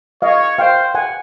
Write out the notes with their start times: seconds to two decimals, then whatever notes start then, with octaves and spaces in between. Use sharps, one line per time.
0.22 C#5 D#5 F5
0.58 C5 F5 G5
0.95 F#5 G#5